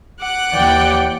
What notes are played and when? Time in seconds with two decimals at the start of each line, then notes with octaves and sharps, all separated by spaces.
0.20 F#5 D6 F#6
0.52 D#2 E3 D5 G5